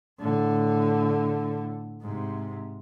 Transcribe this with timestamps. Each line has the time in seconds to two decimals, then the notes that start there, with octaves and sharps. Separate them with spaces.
0.20 A2 D3
2.02 G#2 C3